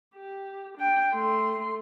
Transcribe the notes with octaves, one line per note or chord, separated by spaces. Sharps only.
G4
D4 G5
A3 C6